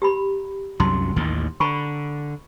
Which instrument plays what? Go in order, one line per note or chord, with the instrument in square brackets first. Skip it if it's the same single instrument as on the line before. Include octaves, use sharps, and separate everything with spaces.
[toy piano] G4 A#5 B5
[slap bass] C2 F#2 F#3 [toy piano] D#4 A#5 C6
[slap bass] A1 D#2 D#3
[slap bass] D3 [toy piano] A#5 B5 C#6